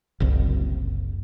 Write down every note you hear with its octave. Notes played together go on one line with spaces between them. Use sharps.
F#1 C2